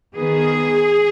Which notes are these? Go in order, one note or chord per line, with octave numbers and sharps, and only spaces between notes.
D#3 B3 G#4